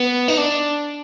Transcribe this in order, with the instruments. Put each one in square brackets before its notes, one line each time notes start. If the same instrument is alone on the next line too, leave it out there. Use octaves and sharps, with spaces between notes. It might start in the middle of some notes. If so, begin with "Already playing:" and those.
Already playing: [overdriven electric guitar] B3
D#4
D4